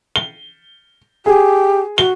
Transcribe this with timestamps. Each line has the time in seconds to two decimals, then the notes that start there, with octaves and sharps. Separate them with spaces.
0.16 G7
1.26 G4 G#4
1.98 F#4 G7